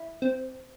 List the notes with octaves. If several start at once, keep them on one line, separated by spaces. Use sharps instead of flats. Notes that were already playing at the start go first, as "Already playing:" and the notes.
Already playing: E4
C4